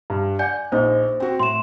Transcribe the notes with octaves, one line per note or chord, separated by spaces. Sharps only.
G2
D5 F#5 G#5 G6
A#1 D#4 C5
C4 F#4
A2 C6 E7